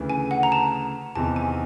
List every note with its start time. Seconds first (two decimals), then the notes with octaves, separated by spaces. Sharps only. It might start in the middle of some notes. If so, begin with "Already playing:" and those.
Already playing: D2 C#3 E3
0.10 G#5
0.31 F#5
0.43 A#5
0.52 A5
1.15 E2 C3 D#3 A5
1.36 G#5